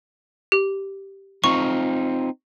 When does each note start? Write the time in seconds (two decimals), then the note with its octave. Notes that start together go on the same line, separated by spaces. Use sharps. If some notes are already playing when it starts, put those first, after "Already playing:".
0.52 G4
1.44 C4 D#4 F4 C#6